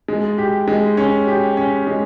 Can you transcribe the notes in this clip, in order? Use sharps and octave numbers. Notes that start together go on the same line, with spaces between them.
G#3
G4
G#3
C#4
G4
C#4
G#3